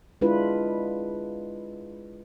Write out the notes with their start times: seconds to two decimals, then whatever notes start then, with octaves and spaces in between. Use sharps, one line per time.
0.21 G#3 D4 E4 F4 B4